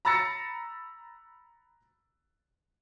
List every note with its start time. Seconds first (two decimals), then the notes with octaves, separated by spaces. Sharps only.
0.05 A#5 B5 E6 A6 A#6 C#7